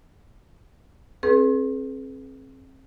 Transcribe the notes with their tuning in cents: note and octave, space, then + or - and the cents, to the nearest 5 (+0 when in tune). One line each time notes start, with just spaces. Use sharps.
C4 +30 G#4 +30 B4 -20